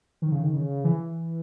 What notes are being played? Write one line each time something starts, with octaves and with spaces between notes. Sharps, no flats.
D#3
C#3
D#3
C#3
E3